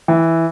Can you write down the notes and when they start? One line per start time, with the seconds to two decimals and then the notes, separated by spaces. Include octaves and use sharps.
0.08 E3